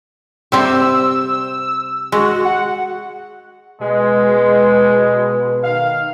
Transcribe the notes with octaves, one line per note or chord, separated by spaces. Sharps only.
C3 G3 C4 E6
G#3 F#4
F#5
B2 G#3
D#3 F5